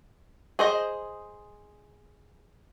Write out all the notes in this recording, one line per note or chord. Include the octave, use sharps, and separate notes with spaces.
G#4 C5 D#5